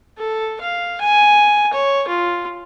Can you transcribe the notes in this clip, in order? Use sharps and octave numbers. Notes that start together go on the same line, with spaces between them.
A4
F5
G#5
C#5
F4